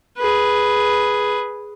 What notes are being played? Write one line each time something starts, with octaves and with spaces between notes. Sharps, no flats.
G#4 B4